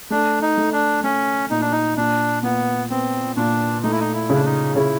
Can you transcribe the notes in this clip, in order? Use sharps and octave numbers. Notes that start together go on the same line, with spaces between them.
A3 D4
D#4
A3
D4
A3 C#4
A#2 D#4
D4
D#4
A#2 D4
A#2 B3
B3 C4
A#2 D4
A3 D#4
E4
D#4
E4
C#3 D4
D#4
C#3 E4